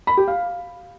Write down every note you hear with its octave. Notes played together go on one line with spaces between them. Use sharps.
B5
G4
F5